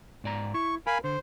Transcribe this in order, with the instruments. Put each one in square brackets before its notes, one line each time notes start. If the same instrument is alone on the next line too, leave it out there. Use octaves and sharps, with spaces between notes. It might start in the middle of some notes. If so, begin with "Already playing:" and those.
[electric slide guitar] G#2 D5 A#5
[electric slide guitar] E4 [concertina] C#6
[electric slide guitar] A#4 [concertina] F5 G#5 B5
[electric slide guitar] D3 [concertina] C5